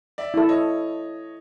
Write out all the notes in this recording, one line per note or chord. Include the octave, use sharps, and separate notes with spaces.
D5 E5
E4 A4
C#5 D#5